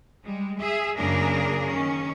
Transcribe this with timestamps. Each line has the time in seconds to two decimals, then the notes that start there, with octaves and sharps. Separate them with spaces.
0.23 G3 G#3
0.60 G#4 E5
0.97 F#2 C#3 A#3 D4 G#4 A#4
1.68 D#3 C#4